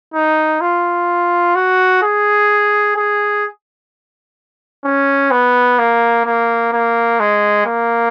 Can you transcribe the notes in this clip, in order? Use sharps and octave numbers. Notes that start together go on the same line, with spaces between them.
D#4
F4
F#4
G#4
G#4
C#4
B3
A#3
A#3
A#3
G#3
A#3